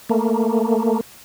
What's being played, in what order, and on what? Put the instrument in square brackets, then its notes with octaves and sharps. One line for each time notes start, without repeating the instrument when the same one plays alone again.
[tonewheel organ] A3 A#3